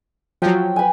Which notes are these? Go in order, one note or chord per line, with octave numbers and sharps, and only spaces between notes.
F3 F#3 G5
B4 G#5